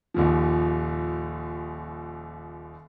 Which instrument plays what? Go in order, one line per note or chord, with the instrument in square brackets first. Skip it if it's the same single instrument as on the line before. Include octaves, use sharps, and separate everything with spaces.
[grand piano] D#1 D#2 F3